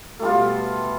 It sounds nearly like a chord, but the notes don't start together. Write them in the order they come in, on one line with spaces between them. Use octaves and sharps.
A3 G3 F4 B2